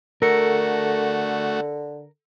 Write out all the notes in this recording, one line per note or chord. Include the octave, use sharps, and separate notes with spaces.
D3 A3 F#4 A4 A#4 C#7